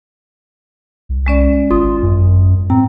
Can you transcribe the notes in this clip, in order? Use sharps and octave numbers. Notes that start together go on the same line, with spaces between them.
C2
G#3 C#4 D5
G#1 F4 D#6
F#2
A2 C4 A#5